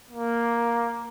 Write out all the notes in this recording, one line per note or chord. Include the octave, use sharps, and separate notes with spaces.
A#3